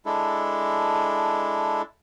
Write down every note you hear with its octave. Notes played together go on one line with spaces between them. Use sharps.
G#3 D4 E4 A4